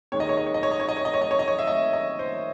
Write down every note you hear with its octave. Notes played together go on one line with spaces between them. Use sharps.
D#2 D#3 G#3 C#5
D#5
C#5
D#5
C#5
D#5
C#5
D#5
C#5
D#5
C#5
D#5
C#5
D#5
C#5
D#5
C#5
E5
D#5
D#5
C5